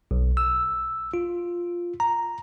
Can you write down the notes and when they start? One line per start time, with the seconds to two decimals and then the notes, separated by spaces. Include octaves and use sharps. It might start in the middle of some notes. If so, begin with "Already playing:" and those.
0.11 B1
0.37 E6
1.14 F4
2.00 A#5